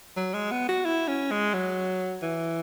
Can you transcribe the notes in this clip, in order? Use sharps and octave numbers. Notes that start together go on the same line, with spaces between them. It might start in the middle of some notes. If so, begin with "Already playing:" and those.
F#3
G#3
B3
F#4
E4
C#4
G#3
F#3
E3